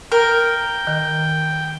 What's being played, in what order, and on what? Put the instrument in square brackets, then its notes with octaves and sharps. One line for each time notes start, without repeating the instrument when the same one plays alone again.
[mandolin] A#4 [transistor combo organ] G5
[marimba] D#3